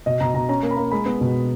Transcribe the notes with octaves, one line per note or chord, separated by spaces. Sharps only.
B2 D#5
B2 A#5
B2 A#5
C#4 A#5
A#3
B5
A#3
G#3 B5
B3
B2